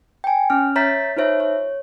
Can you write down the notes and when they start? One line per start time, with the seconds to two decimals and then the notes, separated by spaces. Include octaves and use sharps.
0.24 G5 G#5
0.50 C#4 F6
0.76 C#5 E5 A#5 G6 A6 B6
1.16 D#4 F4 C5 C#5 E5
1.40 C#5